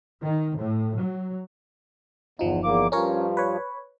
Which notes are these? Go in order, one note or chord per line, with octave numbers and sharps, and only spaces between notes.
D#3
A2
F#3
G1 E2 F3 D#4
E2 A#3 D6
G2 F3 C#4 A#4 C#5
B4 C#5